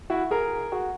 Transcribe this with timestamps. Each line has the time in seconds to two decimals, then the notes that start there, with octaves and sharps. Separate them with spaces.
0.10 E4 F#4
0.31 G#4 A#4
0.72 F#4 G#4